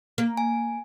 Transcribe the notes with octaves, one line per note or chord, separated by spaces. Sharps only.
A#3
G#5